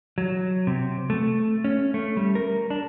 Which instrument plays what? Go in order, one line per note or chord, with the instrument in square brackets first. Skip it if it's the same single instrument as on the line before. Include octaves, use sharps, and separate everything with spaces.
[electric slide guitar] F#3
C3
A3
C#4
A3
G3
A#4
D4